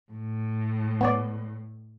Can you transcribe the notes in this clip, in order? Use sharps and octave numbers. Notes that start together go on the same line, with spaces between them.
A2
B3 C#5 D5